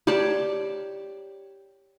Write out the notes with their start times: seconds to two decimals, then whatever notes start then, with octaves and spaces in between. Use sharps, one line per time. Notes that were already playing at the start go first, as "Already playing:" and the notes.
0.07 G4 C#5 D5 A5